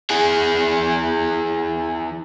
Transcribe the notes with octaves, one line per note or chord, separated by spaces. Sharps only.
E3 G#4